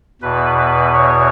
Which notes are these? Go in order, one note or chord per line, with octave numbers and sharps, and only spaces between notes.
E2 B2 B4
B4
C#5